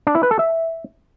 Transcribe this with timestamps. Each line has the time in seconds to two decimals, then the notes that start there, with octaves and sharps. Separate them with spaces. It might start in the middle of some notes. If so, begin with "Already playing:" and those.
0.07 D4
0.15 E4
0.23 B4
0.31 A4
0.39 E5